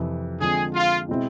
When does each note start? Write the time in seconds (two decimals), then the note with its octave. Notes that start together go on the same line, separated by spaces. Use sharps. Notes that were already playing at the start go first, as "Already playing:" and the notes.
Already playing: F2 C3 E3
0.40 D3 F3 G#3 C4 G#4
0.75 F4
1.09 B2 G#3 C4 E4